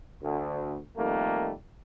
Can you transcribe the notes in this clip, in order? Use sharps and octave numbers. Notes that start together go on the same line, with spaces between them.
D2
F2 D#3 G3 A3 A#3